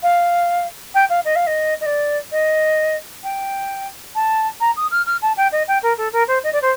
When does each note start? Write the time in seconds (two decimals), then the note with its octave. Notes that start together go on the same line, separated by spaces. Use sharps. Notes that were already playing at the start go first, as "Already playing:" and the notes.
0.02 F5
0.94 G5
1.09 F5
1.24 D#5
1.35 F5
1.46 D#5
1.80 D#5
1.85 D5
2.31 D#5
3.23 G5
4.15 A5
4.60 A#5
4.76 D#6
4.91 F6
5.06 F6
5.21 A5
5.36 G5
5.52 D#5
5.67 G5
5.82 A#4
5.97 A4
6.12 A#4
6.27 C5
6.43 D#5
6.52 D5
6.61 C5